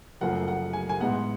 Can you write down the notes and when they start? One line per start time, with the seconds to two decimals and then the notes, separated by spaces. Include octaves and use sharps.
0.21 F#1 F#2 F3 A3 F#5
0.48 F#5
0.73 G#5
0.89 G#5
1.00 A1 G#2 G#3 B3 F#5